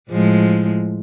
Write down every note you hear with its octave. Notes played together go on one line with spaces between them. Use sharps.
A2 F3 G#3